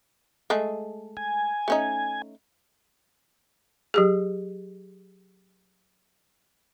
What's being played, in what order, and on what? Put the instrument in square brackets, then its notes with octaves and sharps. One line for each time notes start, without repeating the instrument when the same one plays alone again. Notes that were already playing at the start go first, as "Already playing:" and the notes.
[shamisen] G#3 A3 G#4
[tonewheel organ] G#5
[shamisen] A3 C#4 D#4
[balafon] F#3 G4 G#4